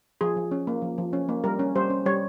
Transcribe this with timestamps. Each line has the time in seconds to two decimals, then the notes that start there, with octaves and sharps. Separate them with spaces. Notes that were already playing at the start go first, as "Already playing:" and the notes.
0.21 F3 G#4
0.37 F3
0.51 C#4
0.67 A#3
0.82 F3
0.98 F3
1.13 C#4
1.29 A#3
1.44 G3 A#4
1.59 C#4
1.75 G3 C5
1.90 C#4
2.06 G3 C#5